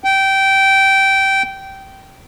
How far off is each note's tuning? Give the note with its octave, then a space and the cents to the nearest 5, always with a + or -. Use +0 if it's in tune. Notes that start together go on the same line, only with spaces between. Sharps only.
G5 -15